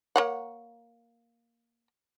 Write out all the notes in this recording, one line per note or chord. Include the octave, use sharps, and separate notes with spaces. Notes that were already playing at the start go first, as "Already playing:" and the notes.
A#3 C#5 F#5